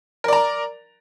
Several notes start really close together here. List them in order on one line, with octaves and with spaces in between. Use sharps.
A#4 D5 A#5